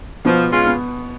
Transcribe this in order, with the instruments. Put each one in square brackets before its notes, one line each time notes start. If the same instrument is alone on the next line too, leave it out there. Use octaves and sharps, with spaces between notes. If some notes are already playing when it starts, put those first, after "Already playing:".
[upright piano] B2 B3 [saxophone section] F3
[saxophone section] G#3 C#4 F4
[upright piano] B3